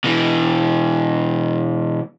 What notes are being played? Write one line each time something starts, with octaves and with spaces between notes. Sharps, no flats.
B2 E3